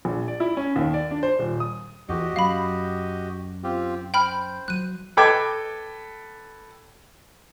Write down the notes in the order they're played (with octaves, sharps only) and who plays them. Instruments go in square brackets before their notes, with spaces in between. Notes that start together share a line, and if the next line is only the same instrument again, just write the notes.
[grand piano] A#1
D5
E4
C#4
D#2
D5
D4
C5
D#1
D#6
[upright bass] E2 [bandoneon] F#4 G4 D#5
[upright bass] F#2 [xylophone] F5 B5
[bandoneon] C4 F4 G4
[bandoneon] C5 [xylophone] G5 B5 F6
[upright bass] F#3 [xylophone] F#6 D#7
[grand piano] A4 B4 D#5 G5 D6 G#6